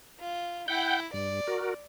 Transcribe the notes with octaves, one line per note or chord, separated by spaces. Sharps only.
F4
E4 F#5 G5 G6
G2 D5
F#4 A#4